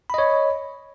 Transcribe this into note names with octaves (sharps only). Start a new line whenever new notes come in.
C#5 D#5 B5